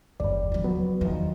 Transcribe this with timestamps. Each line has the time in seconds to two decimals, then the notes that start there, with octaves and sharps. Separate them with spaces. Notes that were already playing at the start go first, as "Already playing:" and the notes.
0.20 F#1 D#2 G3 D5
0.52 C#3 F3
0.64 F#3 B3
1.01 E2 D#3 F3